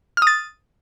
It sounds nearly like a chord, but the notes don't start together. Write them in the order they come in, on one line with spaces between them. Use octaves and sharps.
F6 D#6 A6